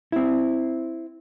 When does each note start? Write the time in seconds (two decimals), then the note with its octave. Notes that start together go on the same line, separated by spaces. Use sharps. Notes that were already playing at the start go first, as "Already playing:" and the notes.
0.12 C4 E4